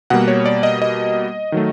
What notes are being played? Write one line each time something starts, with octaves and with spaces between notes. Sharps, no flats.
B2 G3 A#3 F#5
C#5
D5
D#5
D#5
D#3 F#3 A3